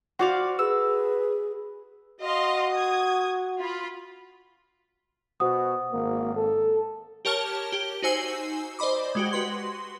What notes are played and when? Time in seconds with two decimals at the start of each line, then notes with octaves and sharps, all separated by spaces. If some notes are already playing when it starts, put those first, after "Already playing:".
0.19 F#4 C5 D5 F5
0.59 G#4 B4 E6
2.21 F#4 D#5 F5 C6
2.71 D#6 G#6
3.58 F4 B5
5.40 B2 F#4 C5 F#5 D#6
5.93 G#1 A#3
6.36 A4
7.25 G4 A#4 C#5 A5 F6
7.72 G4
8.02 D#4 F#4 C5 G#5 E6 C7
8.79 C5 D5 D#5 B5 D6
9.15 G#3 F#4 G4
9.33 F#4 B4 C6